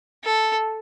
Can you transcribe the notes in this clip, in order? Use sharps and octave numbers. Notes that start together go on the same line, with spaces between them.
A4